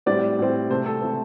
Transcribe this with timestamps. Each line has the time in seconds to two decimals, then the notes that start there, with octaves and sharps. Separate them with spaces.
0.06 A2 G3 C4 D5
0.39 A2 G3 C4
0.70 C3 A3 C4 C5
0.86 A4
1.02 C3 A3 C4